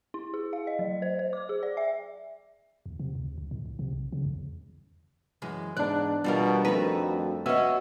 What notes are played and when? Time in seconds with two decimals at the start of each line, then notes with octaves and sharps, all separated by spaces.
0.14 E4
0.34 G#4
0.53 F5
0.67 D#5
0.79 F#3
1.02 C5
1.19 C5
1.33 D6
1.49 G#4
1.63 D5
1.77 E5
2.86 D#2
3.00 C3
3.15 D2
3.38 C#2
3.51 A2
3.66 C2
3.79 C3
3.93 B1
4.13 C#3
4.25 E2
5.42 F#2 E3 G#3
5.77 E2 G#2 D4 D5 F#6
6.24 B2 G3 F4 A#4
6.65 F2 D#3 A3 F#4 A#4 B4
7.46 B3 C#4 F#4 D#5 E5 E6